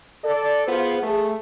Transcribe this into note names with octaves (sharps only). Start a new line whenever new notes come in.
A4 D5
B3 F4 G#4 C5
A3 G#4